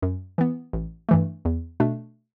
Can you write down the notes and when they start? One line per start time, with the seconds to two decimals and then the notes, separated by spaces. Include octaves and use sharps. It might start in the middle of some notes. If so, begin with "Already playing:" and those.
0.02 F#2
0.38 E3 B3
0.73 A1
1.09 G2 E3 A3
1.45 E2
1.80 B2 A3 D4